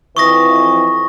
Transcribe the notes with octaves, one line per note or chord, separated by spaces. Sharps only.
F2 E3 C#6 D#6 A#6